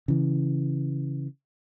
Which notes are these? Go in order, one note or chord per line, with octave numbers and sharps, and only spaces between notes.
C#3 E3